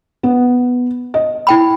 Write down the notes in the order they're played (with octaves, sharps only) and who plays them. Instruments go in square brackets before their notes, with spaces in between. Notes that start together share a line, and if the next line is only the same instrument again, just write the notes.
[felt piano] B3
D#5
[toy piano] E4 G5 B5